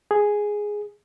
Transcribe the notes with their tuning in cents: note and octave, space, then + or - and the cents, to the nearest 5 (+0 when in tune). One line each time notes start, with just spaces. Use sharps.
G#4 +0